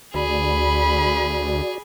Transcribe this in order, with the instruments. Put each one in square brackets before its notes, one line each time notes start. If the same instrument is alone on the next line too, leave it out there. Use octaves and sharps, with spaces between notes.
[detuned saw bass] D2 [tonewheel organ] F#4 D5 [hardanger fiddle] G#4 [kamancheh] B5